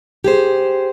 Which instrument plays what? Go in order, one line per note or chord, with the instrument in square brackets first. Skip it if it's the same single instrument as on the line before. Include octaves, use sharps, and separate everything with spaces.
[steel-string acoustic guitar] G4 G#4 C5